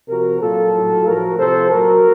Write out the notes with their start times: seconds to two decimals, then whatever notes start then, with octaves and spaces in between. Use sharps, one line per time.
0.09 C3 F3 F#4 A#4
0.41 A#2 F#3 F4 A4
0.73 A2 F#3
1.05 A2 F3 F#4 A#4
1.37 C3 F3 A4 C5
1.69 A#2 F#3 F#4 A#4